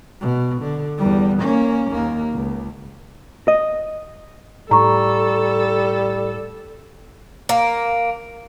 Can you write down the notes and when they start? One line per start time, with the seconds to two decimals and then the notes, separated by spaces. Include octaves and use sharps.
0.21 B2
0.62 D3
0.98 E2 G3
1.41 A#3 C#4
1.91 D#2 A#3
2.33 C#2
3.48 D#5
4.71 A2 G3 A4 A#5 C#6
7.49 A#3